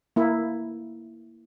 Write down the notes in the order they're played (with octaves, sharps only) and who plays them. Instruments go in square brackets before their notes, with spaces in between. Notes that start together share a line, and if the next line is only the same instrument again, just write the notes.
[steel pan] A#3 E4